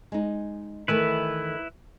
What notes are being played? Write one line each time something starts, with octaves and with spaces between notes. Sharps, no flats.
G#3 D#4
D#3 E3 A3 E4 B4